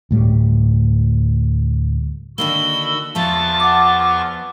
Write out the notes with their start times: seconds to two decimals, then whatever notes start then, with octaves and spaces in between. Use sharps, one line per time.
0.11 D2 A2 G3
2.38 D3 D#3 A#3 F#4 B5 E6 G7
3.15 E2 F3 B3 F4 E5 A5 C#6
3.60 F#5 D6